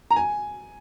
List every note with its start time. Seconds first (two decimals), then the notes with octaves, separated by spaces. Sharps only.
0.11 A#5
0.16 G#5